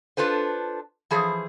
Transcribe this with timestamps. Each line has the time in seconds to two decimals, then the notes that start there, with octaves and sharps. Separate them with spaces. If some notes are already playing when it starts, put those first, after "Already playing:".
0.17 D4 F4 A4 B4 C5
1.11 E3 F3 G#4 C5